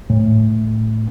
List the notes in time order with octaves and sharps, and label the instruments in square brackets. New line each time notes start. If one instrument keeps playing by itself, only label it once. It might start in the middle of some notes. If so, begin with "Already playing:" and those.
[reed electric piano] A2